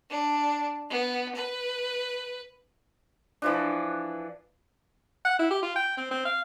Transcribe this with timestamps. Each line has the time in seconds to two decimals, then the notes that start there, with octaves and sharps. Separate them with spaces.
0.10 D4
0.90 B3
1.35 B4
3.42 E3 F3 D4
5.25 F#5
5.39 E4
5.51 G4
5.62 F4
5.76 G5
5.97 C4
6.11 C4
6.25 F5